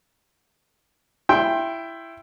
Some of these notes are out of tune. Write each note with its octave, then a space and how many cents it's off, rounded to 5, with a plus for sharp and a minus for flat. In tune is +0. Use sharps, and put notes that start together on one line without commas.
E4 +15 G5 +0 C6 +25